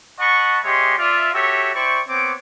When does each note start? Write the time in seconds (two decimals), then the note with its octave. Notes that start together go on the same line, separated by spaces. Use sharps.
0.19 D#5 F#5 A5 B5 C#6
0.64 G#3 G4 C#5 D#5 E5 C6
0.98 F4 D5 E5
1.34 F#4 G4 A4 C#5 E5
1.74 E4 C5 D5 G5 C#6
2.08 B3 C4 C#5 D6